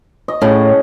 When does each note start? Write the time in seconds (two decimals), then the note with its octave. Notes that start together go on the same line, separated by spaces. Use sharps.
0.28 D#5
0.42 A2 C#3